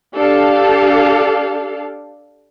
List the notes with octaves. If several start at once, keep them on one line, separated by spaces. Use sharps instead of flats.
D4 G4 A4 F5